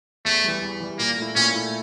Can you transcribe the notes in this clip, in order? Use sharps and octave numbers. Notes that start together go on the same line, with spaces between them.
E2 A3
E3 G3
E2
E3 G3
A#2 A#3
A3 E4
A#2 C#4
A3 E4